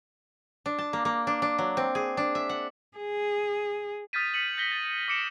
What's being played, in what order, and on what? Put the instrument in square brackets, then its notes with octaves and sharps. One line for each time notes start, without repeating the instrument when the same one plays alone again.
[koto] D4
A5
A#3
A#3
D4
D4
F#3
C4
G#4
D4
E5
F#5
[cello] G#4
[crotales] D#6 F6 G6 A6 B6 D#7
F6 B6 C#7 D#7 F#7
G6 A#6 B6 G7
A6
D6 D#6 C#7 D7 E7